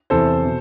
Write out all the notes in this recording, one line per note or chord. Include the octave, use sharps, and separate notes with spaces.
E2 C3 E3 A4 C5
B2